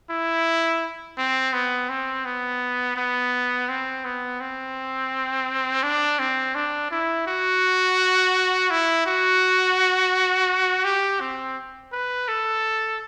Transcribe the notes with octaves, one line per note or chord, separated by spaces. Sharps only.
E4
C4
B3
C4
B3
B3
C4
B3
C4
D4
C4
D4
E4
F#4
E4
F#4
G4
C4
B4
A4